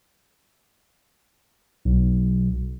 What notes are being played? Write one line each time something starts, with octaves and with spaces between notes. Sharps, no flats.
B1